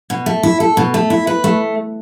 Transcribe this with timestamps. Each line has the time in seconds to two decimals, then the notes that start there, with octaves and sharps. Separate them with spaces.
0.10 B2
0.26 A3
0.43 E4
0.60 A4
0.77 B2
0.94 A3
1.10 E4
1.27 B4
1.44 A3